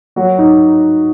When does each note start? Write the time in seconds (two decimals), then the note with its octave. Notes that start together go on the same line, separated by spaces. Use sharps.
0.16 F#3 A#3 F#4
0.38 D#4